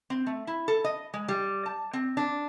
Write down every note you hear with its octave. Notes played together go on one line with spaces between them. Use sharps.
C4
A3
E4
A4
D#5
G#3
G3
A5
C4
D4